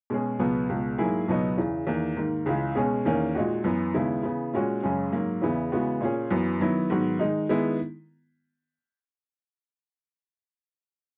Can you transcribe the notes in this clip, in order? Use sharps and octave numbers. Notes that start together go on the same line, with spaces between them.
B2 G#3 C#4 G#4
C#2 B2 F#3 B3
C#2 B2 G#3
G#2 F#3 A#3 E4 G#4
C#2 B2 F#3 B3 D#4
E2 C#3 E3
E2 D#3 A#3
G#2 D#3 A#3
C#2 C#3 E3 G#3
B2 G#3 C#4 G#4
E2 D#3 A#3 C#4
A#2 G#3 D#4 F#4
F#2 E3 B3
D#2 C#3 G#3 B3 E4
C#3 E3 B3
A#2 G#3 C#4 F#4
F#2 C#3 G#3 C#4 G#4
G#2 F#3 A#3
E2 C#3 E3 B3 E4
C#3 E3 G#3 B3 F#4
A#2 A#3 C#4 G#4
F#2 E3 B3 F#4
D#3 F#3 B3 E4
G#2 D#3 F#3 B3 F#4
D#3 G#3 D#4
D#3 G#3 B3 E4 G#4